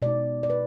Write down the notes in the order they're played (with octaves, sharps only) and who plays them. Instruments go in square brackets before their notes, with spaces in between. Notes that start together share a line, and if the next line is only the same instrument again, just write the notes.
[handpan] B2 G#3 D#4 D5
D5
B4